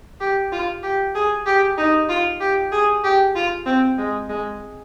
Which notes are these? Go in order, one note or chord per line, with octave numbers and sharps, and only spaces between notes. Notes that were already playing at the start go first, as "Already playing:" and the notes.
G4
F4
G4
G#4
G4
D#4
F4
G4
G#4
G4
F4
C4
G#3
G#3